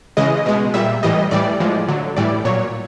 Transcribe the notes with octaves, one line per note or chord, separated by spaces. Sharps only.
C#3 E3 G#3 D#5
B2 G#3
A#2 G3 E5
A2 E3 G3 D#5
A2 E3 G3 D5
A2 F3 G#3
D3 F#3
A2 E3 G3 D5
A#2 F#3 C#5